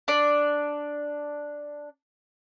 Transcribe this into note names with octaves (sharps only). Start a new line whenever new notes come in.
D4 D5